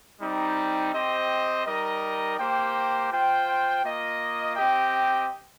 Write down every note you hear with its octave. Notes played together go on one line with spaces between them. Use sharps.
G3 C4 D#4
C4 G4 C5 D#5
G3 D#4 A#4 D#5
A#3 G4 C5 G5
F4 C5 G5
A#3 F4 D#5
C4 G4 D#5 G5